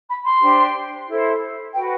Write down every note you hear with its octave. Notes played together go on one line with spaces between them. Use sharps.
B5
C6
D4 G4 C5
E4 A4 C5
F#4 B4 G5